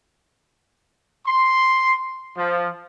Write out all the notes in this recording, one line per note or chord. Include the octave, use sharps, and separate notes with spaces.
C6
F3